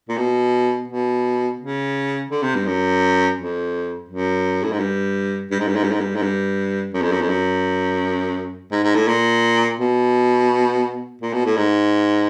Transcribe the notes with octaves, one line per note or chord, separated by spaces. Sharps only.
A#2
B2
B2
C#3
D3
C3
G2
F#2
F2
F#2
A2
G#2
G2
G2
G#2
G2
G#2
G2
G#2
G2
G#2
G2
F#2
F2
F#2
F2
F#2
G#2
G#2
A2
A#2
B2
A#2
B2
A2
G#2